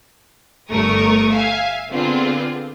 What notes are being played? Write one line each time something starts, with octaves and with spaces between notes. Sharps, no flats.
G1 A3 A#4 C#6 D#6
E5 F5 G#5
D3 B3 C4 D4 F4 G#4